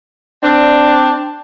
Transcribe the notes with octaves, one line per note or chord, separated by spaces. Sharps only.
C4 D4